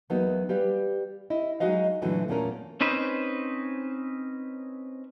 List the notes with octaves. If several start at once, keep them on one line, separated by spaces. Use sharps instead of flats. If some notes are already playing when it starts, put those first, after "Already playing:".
E2 F#3 G#3 A#3 B3 D#4
G3 G4 B4 F5
E4 D#5
F#3 G#3 D#4 F#4 D#5 F5
F#2 A#2 D3 E3 F#3 A3
E2 A#2 A3 A#3 C#4 A#4
C4 C#4 D#4 B4 C5